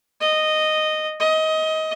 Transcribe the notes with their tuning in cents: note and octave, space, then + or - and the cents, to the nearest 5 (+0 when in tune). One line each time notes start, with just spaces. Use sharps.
D#5 -10
D#5 +20